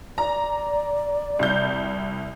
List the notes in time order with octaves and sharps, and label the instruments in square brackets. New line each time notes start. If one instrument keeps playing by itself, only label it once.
[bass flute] D5 [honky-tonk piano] A#5
[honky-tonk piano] C2 G6